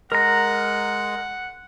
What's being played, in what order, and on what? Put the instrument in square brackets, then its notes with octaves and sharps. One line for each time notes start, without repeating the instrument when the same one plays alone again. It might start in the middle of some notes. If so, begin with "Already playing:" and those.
[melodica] G#3 [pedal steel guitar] A#4 A#5 [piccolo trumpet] F#5